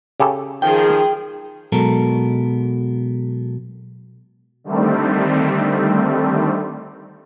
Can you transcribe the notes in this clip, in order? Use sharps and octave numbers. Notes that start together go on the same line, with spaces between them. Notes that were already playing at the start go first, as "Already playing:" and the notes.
C#3 G4 A4
D#3 F3 G#4 G5
B2 F#3 G#3 B3 A4 A#4
D3 D#3 G3 A3 C4